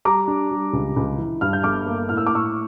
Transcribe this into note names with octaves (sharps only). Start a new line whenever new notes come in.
G3 A#5 D6
D4
G3
C#2
C#2
E3
G2 F6
G6
G1 D6 F6
A#3
A2 F6
E6
D6
A2 C#6 E6